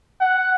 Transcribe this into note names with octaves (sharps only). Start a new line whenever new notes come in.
F#5